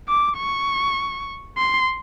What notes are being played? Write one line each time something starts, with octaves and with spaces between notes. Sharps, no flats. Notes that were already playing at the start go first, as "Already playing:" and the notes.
D6
C#6
C6